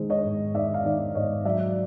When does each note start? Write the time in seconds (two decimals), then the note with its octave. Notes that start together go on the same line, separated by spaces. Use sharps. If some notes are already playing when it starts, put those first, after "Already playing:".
Already playing: D#3 G#3 C5
0.10 C#5 D#5
0.25 G#2
0.55 D#3 D5 E5
0.74 F5
0.85 D#3 D5 E5
1.15 G#2 C#5 D#5
1.45 F#3 D5 E5